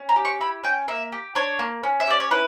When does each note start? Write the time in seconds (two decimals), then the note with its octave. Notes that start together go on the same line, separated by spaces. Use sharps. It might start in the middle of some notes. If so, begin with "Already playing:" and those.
Already playing: C#4
0.09 A#5
0.16 G4
0.25 C#6
0.41 E4 B5
0.64 C#4 G5
0.88 A#3 E5
1.12 G4
1.35 D4 C#5
1.59 A#3
1.83 C#4
2.00 E5
2.07 G4 D5
2.20 C#5
2.31 E4 B4